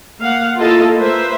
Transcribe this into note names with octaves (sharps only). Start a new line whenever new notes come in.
A#3 F5 F#5
A#3 E4 F4 A4 D#5 F5
A#3 B4 C5 E5